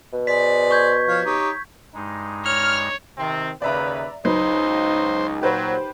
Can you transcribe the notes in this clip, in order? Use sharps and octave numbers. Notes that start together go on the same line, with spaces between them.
B2
G#4 C5 D5 B6
C#6 G6 G#6
F3 C#5 F5
D#4 G4 C#5
G2 G#3 D#4
C#5 F6
C3 D#3 C4
D#2 C#3 B4 D5 E5 A#5
C#2 F#3 D#4 B4 C5
A#2 F#3 G4 B4 C5